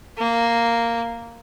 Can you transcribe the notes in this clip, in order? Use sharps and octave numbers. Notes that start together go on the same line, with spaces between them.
A#3